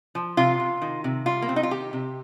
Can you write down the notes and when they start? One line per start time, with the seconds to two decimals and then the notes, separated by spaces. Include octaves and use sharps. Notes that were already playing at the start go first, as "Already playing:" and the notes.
0.15 F3
0.37 C3 F4
0.60 C3
0.82 D#3
1.04 C3
1.26 G3 F4
1.42 A#3
1.48 C3 C4
1.56 D#4
1.63 F4
1.71 D#3 G4
1.93 C3